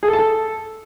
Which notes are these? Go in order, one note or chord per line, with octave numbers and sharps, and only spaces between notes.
G#4
A4
A5
A4